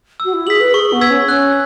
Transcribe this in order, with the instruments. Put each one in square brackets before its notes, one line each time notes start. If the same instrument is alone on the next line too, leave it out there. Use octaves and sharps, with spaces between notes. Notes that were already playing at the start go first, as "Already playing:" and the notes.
[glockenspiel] E6
[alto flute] F#4
E4
[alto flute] G#4 [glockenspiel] B6 F#7
[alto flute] B4
[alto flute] G#4 [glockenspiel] C#6
[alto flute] B3
[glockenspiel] E6 G#6 B6
[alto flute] C#4
[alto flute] C#4 [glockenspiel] F#6